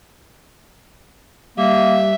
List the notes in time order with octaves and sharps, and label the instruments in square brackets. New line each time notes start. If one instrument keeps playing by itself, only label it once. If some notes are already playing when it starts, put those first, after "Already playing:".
[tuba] G3 [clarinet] A#3 [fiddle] E5